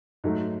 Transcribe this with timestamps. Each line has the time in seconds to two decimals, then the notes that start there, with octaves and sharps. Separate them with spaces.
0.24 G#2 F#3 A3